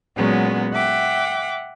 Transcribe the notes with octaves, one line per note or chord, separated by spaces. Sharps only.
A#2 F#3 G#3 B3 C#4
E5 F#5 G5 D6